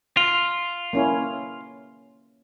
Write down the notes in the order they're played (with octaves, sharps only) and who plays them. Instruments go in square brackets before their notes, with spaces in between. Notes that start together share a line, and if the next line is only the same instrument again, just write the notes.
[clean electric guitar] F4
[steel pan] A#3 C#4 E4